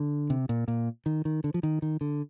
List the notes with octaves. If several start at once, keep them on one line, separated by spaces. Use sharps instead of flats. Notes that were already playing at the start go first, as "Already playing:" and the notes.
Already playing: D3
C3
A#2
A#2
D#3
D#3
D3
F3
D#3
D#3
D3